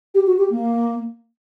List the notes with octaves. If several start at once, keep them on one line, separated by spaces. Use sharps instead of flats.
G4
F#4
G4
A#3